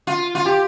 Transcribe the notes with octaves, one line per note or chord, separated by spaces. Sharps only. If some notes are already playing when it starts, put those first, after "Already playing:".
F4
F4
G4